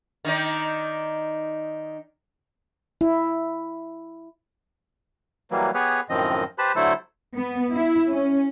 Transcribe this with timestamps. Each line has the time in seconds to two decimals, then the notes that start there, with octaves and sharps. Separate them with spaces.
0.25 D#3 D#4 D5
3.01 E4
5.51 E3 F#3 G3 A#3
5.74 B3 G4 G#4 B4 C#5
6.09 F#2 A2 D#3 F3 C4 D#5
6.58 G4 B4 C5 A5 B5
6.76 D3 F#3 A3 E4 A4 C5
7.35 B3
7.73 E4
8.11 C#4